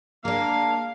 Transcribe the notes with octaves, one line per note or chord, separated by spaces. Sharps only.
G#3 A#3 D4 F5